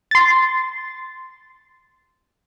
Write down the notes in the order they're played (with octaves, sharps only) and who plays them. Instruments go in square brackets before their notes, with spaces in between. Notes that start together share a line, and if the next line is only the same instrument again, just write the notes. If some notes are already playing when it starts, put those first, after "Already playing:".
[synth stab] C6 A6